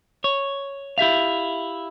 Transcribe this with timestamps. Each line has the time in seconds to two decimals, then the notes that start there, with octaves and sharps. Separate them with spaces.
0.24 C#5
0.98 E4 G4 E5 F5